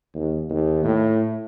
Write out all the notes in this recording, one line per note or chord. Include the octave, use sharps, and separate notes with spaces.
D#2
D#2
A2